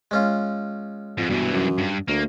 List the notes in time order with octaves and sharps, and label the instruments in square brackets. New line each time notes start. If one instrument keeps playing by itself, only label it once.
[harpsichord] G#3 C#4 F4
[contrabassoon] F2 [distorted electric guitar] G#2
[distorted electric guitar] G2 E3 [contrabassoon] B2
[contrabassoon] F#2
[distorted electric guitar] G2
[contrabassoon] D2 [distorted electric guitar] A#3